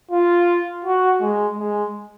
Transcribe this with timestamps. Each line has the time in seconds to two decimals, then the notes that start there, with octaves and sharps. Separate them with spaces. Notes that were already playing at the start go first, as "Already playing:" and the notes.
0.11 F4
0.85 F#4
1.21 G#3
1.58 G#3